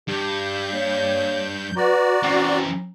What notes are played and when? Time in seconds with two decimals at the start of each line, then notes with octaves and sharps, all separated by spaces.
0.08 G2 G4 G6
0.73 A#3 C#5
1.76 F#4 B4 D5 A#5
2.23 E3 C4 C#4